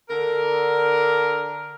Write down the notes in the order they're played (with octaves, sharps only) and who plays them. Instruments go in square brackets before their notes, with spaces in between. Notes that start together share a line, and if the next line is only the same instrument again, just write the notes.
[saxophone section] D3 A#4